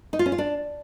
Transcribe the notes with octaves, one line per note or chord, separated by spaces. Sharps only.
D#4
F4
C#4
F4
D4